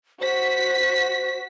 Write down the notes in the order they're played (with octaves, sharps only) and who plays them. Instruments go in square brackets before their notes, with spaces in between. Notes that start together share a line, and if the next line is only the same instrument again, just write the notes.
[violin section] F#4 B6 [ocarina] C5